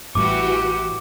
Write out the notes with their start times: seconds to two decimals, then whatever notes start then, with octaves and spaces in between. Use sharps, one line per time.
0.15 A1 A2 E3 G3 F#4 G4 D6